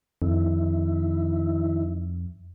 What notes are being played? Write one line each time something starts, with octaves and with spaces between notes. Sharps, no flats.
F2 D#3 E4